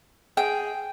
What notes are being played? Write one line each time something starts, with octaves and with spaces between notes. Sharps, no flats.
G#4 G5